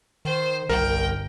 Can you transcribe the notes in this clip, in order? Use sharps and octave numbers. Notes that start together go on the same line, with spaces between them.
D#3 C5
G1 C2 A#4 G5